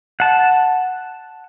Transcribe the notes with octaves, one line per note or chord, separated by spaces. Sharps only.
F#5 A5